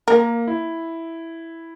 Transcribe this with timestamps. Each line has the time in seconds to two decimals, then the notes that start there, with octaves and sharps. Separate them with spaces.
0.08 A#3 A#4
0.48 E4